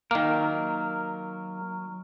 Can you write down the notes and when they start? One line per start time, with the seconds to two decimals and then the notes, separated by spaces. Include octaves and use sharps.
0.11 D#3 F#3 A#3 A#4